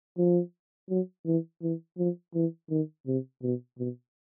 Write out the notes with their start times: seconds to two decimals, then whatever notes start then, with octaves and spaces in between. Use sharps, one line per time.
0.18 F3
0.89 F#3
1.26 E3
1.62 E3
1.98 F3
2.35 E3
2.70 D#3
3.07 C3
3.42 B2
3.78 B2